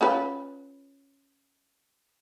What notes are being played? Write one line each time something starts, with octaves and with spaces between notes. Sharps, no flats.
C#4 F4 B4